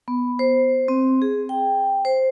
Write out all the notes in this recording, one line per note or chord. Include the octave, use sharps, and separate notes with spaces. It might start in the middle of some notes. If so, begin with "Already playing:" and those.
B3
C5
C4
G#4
G5
C5